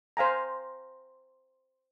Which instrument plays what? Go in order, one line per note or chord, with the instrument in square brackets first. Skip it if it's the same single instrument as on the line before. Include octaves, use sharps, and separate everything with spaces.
[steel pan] C5 F5 G#5 A#5